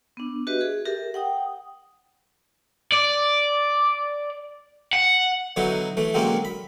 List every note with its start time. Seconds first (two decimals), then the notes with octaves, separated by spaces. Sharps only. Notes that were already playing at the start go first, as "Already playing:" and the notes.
0.17 B3 D4
0.47 F#4 G4 B4 D#5 E5
0.61 G#4
0.85 G4 A4 A#4 E5
1.14 F#5 G5 D#6
2.92 D5
4.93 F#5
5.56 B2 D3 F#3 D#4 E4
5.97 E3 A3
6.14 D3 F#3 G#3 A#3 C4 C#4
6.45 B5